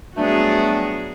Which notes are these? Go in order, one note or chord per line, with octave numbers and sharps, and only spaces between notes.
F#3 G3 A3 B3 D4 G#4